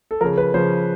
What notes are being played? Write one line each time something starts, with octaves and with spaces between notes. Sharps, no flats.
A4
C#3 F3 A#4
B4
C#3 F3 C5